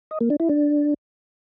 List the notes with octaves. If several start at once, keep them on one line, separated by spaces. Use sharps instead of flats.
D#5
A#3
D4
E4
D4